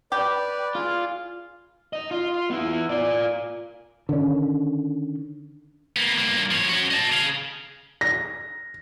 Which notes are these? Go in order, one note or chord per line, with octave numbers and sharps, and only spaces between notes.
G4 B4 D5
F4 G#4 D5
D#4 D#5
F4
B3 E4
F4 D5
D3 D#3 C#4
A#3 B3
G2 A#3
F3 C#5
C#4 F#4
D#5 A5
G#4 F5
A#6